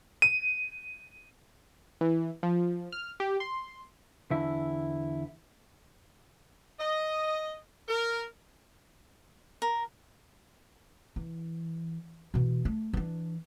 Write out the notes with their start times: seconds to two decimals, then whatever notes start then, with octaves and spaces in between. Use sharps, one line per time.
0.22 D#7
2.01 E3
2.43 F3
2.92 F6
3.20 G4
3.40 C6
4.31 E2 D3 E4
6.79 D#5
7.88 A#4
9.62 A#4
11.16 E3
12.34 B2 E3
12.65 A3
12.93 E3 D4